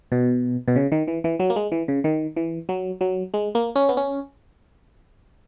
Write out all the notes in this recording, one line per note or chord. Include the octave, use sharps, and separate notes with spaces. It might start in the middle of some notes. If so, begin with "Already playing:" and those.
B2
B2
C#3
D#3
E3
E3
F#3
A#3
G#3
E3
C#3
D#3
E3
F#3
F#3
G#3
A#3
C#4
B3
C#4